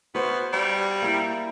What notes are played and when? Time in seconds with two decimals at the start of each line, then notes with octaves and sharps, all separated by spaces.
0.15 B3 F#4 C5
0.53 G3
1.02 A#3 E4